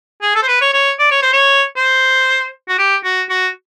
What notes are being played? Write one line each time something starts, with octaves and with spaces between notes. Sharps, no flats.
G#4
A4
C5
B4
C#5
C#5
D5
C#5
C5
C#5
C5
F#4
G4
F#4
F#4